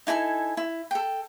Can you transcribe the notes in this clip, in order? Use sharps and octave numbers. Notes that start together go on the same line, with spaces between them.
D#4 E4 A4 G#5
E4
A4 G5